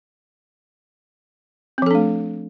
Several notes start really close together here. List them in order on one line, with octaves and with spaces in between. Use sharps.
C4 F3 A4 D4 A3